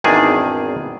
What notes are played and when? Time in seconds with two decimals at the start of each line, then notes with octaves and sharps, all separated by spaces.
0.04 G#1 E2 D#3 D4 G#4